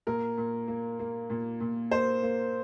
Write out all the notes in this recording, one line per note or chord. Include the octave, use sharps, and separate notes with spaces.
A#2 A#4
A#2
A#3
A#3
A#2
A#2
A#3 C5
A#3